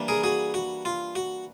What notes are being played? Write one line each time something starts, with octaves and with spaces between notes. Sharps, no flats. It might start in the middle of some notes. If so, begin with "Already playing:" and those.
Already playing: E3 G3 A#3 D4
G#4 A#4
F#4 G#4
F#4
F4
F#4